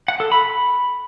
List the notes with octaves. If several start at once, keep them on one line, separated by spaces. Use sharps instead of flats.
F#5
A4
B5